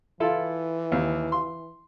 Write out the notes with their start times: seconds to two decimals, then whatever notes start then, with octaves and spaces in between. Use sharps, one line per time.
0.20 E3 E4 F4 A4
0.92 D#2
1.32 C6